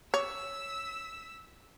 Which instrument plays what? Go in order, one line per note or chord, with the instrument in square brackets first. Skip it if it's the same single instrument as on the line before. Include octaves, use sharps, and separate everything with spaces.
[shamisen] C#5 [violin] E6 B6